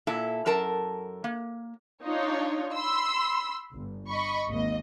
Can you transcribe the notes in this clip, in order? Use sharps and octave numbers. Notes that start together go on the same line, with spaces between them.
A#2 E4 A4
F#2 A4 A#4 A5
A#3
D4 D#4 F4 C#5
B5 C6 E6
G1
D#5 B5 C#6
G#1 D#2 D#5